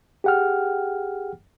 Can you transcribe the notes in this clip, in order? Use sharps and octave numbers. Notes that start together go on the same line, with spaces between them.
G4 G#4 F#5 G5 F6